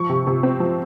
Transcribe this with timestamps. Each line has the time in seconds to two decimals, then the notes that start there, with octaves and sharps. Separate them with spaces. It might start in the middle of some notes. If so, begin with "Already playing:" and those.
Already playing: F3 C#6
0.09 C3
0.27 C3
0.43 C4
0.60 F3